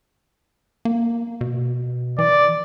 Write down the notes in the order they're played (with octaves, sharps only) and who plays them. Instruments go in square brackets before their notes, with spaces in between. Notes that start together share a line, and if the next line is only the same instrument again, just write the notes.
[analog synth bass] A#3
B2
[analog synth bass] E3 [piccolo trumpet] D5